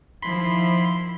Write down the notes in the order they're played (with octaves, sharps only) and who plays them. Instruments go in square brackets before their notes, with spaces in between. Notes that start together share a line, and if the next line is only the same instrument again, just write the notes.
[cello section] D#3 F3 E4 [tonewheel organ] B5 C6